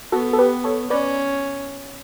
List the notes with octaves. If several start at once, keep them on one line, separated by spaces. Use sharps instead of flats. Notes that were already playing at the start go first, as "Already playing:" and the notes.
B3 F#4 A4
A4
G4 B4
A4 C#5
C#4 B4 D5